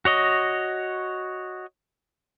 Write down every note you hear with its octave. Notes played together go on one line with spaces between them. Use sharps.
F#4 C#5 D#5